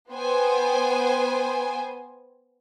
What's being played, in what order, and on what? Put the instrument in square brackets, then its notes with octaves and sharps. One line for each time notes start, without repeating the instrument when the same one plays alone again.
[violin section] B3 C5 G5 G#5